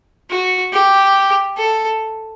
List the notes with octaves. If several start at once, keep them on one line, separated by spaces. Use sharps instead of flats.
F#4
G4
A4